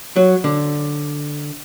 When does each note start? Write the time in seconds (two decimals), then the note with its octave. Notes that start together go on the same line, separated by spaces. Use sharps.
0.16 F#3
0.44 D3